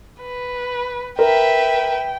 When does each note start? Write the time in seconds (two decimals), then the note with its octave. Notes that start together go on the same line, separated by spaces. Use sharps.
0.21 B4
1.19 A#4 B4 E5 G5